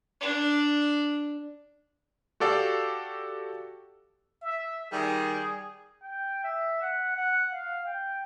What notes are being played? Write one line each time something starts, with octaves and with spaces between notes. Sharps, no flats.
D4
F#4 G4 A4 D5 F5 G5
E5
D#3 G3 G#4
G5
E5
F#5
F#5
F5
G5